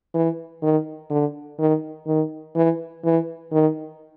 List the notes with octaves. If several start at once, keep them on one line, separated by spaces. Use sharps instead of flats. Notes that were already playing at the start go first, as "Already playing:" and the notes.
E3
D#3
D3
D#3
D#3
E3
E3
D#3